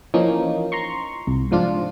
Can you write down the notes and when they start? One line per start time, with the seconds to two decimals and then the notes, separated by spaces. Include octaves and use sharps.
0.14 E3 F3 A#3 C#4 D#4
0.72 A#5 C6 C#6
1.27 C2
1.51 G#2 F3 D4 F4